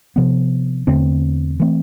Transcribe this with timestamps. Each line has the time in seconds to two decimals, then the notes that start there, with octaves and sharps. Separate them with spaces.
0.16 C3 F3 B3
0.87 E2 D3 A3 C4
1.60 E3 A3 C4